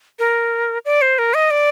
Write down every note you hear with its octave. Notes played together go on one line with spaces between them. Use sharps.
A#4
D5
C5
A#4
D#5
D5